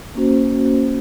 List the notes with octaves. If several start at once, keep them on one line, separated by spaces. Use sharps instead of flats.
A#3 C#4 F#4 C5